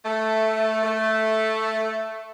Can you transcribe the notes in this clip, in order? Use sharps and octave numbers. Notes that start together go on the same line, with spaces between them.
A3
A3